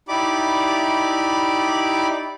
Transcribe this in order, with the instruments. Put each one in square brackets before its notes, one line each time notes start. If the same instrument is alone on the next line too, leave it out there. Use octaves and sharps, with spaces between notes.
[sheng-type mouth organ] D#4 E4 G4 D5 B5 D6